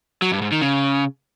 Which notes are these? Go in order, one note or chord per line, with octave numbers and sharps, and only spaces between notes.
F#3
G2
G#2
D#3
C#3